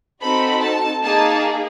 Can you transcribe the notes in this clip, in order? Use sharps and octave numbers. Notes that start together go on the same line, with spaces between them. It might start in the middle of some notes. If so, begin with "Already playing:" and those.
C4 D#4 F#4 A4 B5
A5
A#3 D#4 G#4 A5